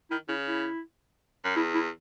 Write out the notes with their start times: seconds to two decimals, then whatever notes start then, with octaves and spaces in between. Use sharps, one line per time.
0.11 D#3 E4
0.29 C#3 E4
0.48 E4
1.44 F#2
1.56 E2 E4
1.74 E4